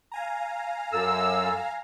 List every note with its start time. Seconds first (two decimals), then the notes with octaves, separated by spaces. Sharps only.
0.12 F5 G#5 A#5
0.93 F#2 A4 E6